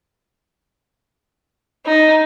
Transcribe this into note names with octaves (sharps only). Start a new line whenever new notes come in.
D#4